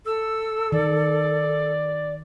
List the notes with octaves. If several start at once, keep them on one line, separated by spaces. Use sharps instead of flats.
A4 E6
D#3 D5